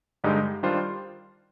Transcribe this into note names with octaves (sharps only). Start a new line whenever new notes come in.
G2 D3 G#3 D#4 G4
D#3 G3 D4 F4 C5